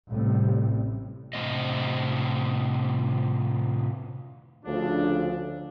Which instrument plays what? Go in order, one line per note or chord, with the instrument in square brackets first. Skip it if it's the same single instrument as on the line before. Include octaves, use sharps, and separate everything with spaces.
[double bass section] A1 A2 C3 G3
[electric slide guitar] A2 C3 F3 B3 C4 D#5
[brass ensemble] D2 C#3 F3 D4